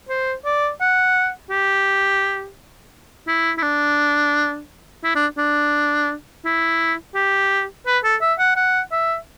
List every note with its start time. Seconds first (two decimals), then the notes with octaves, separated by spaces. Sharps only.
0.09 C5
0.45 D5
0.81 F#5
1.50 G4
3.27 E4
3.58 E4
3.62 D4
5.04 E4
5.15 D4
5.38 D4
6.45 E4
7.15 G4
7.86 B4
8.04 A4
8.21 E5
8.39 F#5
8.56 F#5
8.92 E5